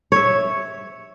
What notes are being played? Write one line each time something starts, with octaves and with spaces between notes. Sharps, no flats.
C#5 E5